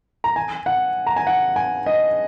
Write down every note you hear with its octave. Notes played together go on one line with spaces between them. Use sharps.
A#5
G#5
F#5
A#5
G#5
F#5
G#5
D#5